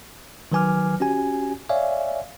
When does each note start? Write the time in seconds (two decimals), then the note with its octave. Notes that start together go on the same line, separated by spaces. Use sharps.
0.52 D#3 F#3 B4 G#5 D6 F6
1.00 C#4 F#4 G4 G#5
1.69 C#5 D5 E5 F5 G#5